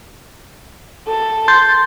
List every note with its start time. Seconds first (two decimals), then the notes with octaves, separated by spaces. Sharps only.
1.08 A4
1.48 C6 G6 A6